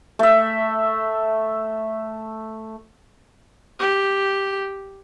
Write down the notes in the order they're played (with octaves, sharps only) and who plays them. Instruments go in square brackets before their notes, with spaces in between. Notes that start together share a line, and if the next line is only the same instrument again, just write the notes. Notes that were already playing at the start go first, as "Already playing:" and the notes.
[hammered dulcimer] A3 E5
[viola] G4